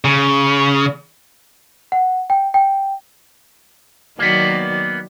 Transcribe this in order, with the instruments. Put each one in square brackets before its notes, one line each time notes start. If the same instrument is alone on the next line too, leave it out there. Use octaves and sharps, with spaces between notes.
[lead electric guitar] C#3
[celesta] F#5
G5
G5
[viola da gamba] D#3 F#3 D5 [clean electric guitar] A#3 B3